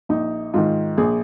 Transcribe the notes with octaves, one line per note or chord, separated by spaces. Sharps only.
A#1 D#4
G#2 D#3 F4
A#1 G#4